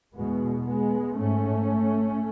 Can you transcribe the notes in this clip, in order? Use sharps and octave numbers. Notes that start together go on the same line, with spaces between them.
E2 B2 G#3 B3
G#3 B3
G#2 A3 C#4